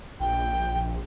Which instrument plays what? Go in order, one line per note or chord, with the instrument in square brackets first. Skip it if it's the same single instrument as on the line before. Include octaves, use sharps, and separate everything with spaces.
[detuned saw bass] A#1 [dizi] G5